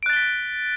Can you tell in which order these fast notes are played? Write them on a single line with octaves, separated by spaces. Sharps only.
D7 F#6 A6 G7 B6